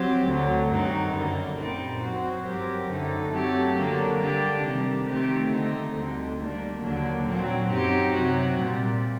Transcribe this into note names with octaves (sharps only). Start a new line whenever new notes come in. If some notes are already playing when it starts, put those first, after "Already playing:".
Already playing: F#3 C4 G4 C5
D2 D3 F#3
G2 D#3 F#3 C4 D#4
F#2 D3 G3 A#3
A#2 G3 C4 D#4
F#3 C4 F#4 C5
G2 F#3 C4 G4 A#4
F#2 D3 A3 D#4
F#3 A3 C4 G4
D3 F#3 A#3 D4
D3 G3 D4 G4
C3 D#3 G3
D#3 A3 C4 G4
D3 A3 C4 D#4
D2 D3 G3 C4
D#3 G3 A#3 D4
D#2 D3 F#3 A#3 D4
A#2 F#3 C4
F#2 F#3 C4 D#4 G4
C3 F#3 C4 F#4
A#2 G3 C4